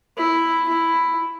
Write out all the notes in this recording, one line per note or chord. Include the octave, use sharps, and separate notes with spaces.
E4
E4